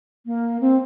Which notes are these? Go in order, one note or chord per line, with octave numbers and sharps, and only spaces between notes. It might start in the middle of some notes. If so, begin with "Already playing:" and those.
A#3
C4